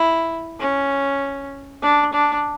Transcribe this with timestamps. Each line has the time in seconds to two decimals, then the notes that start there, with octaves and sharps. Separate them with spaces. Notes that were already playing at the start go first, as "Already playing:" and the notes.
Already playing: E4
0.60 C#4
1.82 D4
2.13 D4